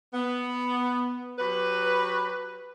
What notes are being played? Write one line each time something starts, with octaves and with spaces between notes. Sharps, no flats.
B3
F#3 G4 B4